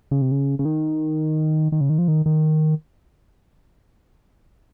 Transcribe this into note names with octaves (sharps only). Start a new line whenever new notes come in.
C#3
C3
C#3
C#3
D#3
D#3
C#3
D#3
F3
D#3
D#3